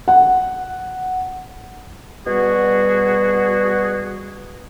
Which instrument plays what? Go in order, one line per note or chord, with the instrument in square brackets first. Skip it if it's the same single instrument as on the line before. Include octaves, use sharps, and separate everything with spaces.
[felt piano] F#5
[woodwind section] B2 G3 F#4 G#4